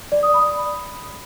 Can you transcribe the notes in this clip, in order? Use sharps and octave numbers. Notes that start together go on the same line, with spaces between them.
D5
D#6
B5